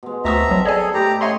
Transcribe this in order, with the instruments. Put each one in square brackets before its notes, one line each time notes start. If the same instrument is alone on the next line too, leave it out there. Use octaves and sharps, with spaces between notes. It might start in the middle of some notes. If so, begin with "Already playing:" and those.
[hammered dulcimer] B2 G#3
[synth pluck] D2 C#6 D#6 [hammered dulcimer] C4 D#4 A5 [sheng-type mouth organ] E5 A#5
[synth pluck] G#1 F#3
[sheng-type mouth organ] G#4 A4 [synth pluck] C#5 D5 G#5
[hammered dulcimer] A2 E4 D#5 [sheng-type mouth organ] G4 A#5
[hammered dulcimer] C#4 D#4 [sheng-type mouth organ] C#5 D#5 C6 [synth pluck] E5 G5 A#5